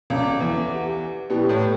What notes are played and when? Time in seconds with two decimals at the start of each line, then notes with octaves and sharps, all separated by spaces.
0.10 C#2 C#3 F#4 A4 D5 A5 D6
0.40 E2 E3
0.70 G4 B4 F#5
1.30 B2 B3 E4 G4 B4 D5 G5
1.49 A2 A3